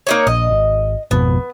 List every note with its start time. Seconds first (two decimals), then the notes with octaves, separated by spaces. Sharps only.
0.07 A#3 D#4 C#5
0.27 A#1 D#5
0.51 G#1
1.11 G#1 F2 B2 B3